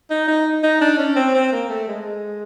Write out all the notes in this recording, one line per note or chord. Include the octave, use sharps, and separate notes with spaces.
D#4
D#4
D#4
D4
C#4
C4
C4
A#3
A3
G#3